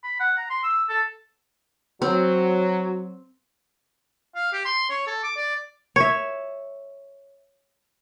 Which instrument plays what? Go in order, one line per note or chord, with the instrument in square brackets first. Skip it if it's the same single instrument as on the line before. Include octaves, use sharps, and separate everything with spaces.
[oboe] B5
F#5
A#5
C6
E6
A4
[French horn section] F#3 [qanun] C4
[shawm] F5
G4
C6
C#5
A4
D6
D5
[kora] C#5 E5